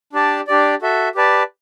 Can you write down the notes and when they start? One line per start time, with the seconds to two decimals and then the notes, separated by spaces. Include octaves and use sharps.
0.13 D4 G4 D5 A5
0.47 D4 G4 D5
0.82 F#4 A4 E5
1.15 G4 B4 D5 A5